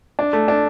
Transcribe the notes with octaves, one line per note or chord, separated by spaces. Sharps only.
D4
A3
D4